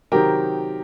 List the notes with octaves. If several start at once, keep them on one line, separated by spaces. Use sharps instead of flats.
C3 D#3 F#3 C4 D#4 G4 A#4